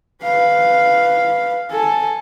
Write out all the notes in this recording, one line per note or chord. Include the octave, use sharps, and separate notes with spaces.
B4 F5
A4 G#5